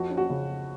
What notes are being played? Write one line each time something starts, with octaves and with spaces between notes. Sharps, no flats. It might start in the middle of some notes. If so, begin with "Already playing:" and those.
Already playing: F2 F#4
C#4
F#4
C#3